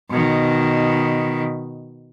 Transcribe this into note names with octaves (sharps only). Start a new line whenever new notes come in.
B2 D#3